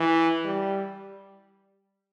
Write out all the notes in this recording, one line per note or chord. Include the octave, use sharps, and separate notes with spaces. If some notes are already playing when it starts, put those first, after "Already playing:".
Already playing: E3
G3